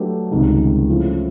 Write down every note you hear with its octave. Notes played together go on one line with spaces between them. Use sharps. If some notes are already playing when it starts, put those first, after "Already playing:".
Already playing: F#3 A3 D4 G4 B4
C#2 C3 D#3 G3
F3 A3 C#4 E4